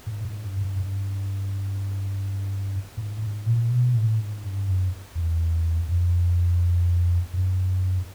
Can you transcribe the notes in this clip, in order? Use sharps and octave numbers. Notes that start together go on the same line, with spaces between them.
G#2
G#2
G2
G2
G2
G#2
G#2
A#2
B2
A2
G#2
G2
F#2
E2
F2
F#2